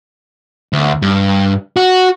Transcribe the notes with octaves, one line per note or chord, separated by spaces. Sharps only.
D2
G2
F#4